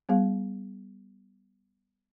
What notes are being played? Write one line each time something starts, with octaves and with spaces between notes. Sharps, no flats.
G3 B3 G#4 F5